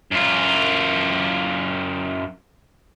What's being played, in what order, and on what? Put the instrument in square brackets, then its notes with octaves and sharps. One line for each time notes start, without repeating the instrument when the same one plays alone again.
[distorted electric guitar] F#2 F4